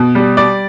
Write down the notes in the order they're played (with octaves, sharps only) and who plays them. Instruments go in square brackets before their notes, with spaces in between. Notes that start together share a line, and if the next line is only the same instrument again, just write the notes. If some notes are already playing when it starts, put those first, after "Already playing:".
Already playing: [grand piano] B2
G3
G3 D5